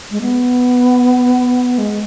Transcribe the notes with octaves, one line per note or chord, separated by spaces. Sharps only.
G#3
B3
G#3